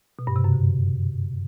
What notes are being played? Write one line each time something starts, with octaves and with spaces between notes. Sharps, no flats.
B2
G2
C3
F#2
D3